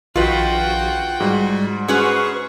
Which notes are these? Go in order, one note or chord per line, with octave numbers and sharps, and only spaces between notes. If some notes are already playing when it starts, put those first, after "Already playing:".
A#1 D#3 F4 F#4 B4 F#5 G5
G#2 G3 F#4
C#4 F#4 G#4 B4 C5 C#6